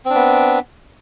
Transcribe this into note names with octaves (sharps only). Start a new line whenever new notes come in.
B3 C4 D4